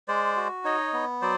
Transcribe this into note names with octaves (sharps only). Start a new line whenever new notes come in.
G#3 C5 D5
F#4
D#4 C#5 D#5
B3
F#3 C5 D5